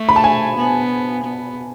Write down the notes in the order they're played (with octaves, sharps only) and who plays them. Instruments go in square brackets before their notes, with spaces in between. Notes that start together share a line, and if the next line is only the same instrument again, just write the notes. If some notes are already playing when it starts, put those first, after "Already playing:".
Already playing: [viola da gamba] A3
[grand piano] B5
A5
G#5
[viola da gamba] B3
B3